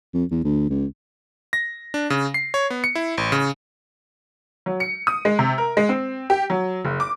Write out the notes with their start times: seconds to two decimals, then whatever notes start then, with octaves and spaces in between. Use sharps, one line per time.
0.14 F2
0.30 E2
0.44 D2
0.70 C#2
1.53 A#6
1.94 D4
2.10 C#3
2.34 C7
2.54 C#5
2.70 B3
2.84 C#7
2.95 E4
3.18 A1
3.32 C#3
4.66 F#3
4.80 C#7
5.07 D#6
5.25 G#3
5.39 C3
5.58 A#4
5.77 G#3
5.89 C4
6.30 G4
6.50 F#3
6.85 F#1
7.00 D6